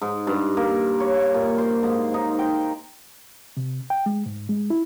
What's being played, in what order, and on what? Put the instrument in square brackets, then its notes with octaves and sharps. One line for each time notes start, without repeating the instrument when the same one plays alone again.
[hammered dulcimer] G#2
G2
A#3
C#5
A#2
C5
G#2
D#4
G5
[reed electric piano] C3
G5
G#3
G#2
G#3
E4